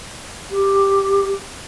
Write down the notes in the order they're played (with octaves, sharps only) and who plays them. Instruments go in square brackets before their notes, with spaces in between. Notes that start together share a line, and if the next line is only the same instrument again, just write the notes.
[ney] G4